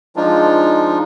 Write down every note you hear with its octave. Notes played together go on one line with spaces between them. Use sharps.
F3 G#3 D4 D#4 F4